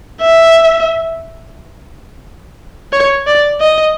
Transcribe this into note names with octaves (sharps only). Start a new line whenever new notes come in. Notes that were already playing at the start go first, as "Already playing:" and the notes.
E5
C#5
D5
D#5